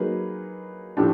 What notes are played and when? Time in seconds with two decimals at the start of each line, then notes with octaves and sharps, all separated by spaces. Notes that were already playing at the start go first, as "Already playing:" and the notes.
Already playing: F#3 A#3 D#4 G#4 B4
0.97 A2 F3 A3 D4 G4